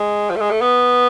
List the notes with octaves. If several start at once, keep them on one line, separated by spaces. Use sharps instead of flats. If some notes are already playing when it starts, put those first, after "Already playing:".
Already playing: G#3
F3
A3
G#3
A3
B3